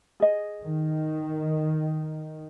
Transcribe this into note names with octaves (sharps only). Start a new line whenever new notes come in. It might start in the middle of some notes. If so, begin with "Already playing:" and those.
G#4 D#5
D#3